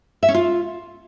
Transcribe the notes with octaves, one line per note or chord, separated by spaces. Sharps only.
E5
C#4
F4